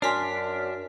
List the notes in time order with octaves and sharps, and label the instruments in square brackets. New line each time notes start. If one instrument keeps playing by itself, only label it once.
[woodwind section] F#2 [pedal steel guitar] D4 [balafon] C#5 G#5 C6 [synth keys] F6 B6